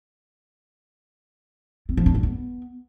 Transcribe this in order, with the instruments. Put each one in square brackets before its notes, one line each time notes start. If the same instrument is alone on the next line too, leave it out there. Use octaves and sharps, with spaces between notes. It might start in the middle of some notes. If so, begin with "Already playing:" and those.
[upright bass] C4
F3
D4
G3
B3